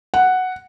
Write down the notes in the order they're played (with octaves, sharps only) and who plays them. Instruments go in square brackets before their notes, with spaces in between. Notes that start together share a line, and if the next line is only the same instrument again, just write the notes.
[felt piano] F#5